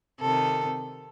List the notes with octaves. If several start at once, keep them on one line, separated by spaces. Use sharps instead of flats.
C3 D#3 A4